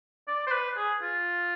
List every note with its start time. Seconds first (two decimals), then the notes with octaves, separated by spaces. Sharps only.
0.28 D5
0.47 C5
0.52 B4
0.77 G#4
1.02 F4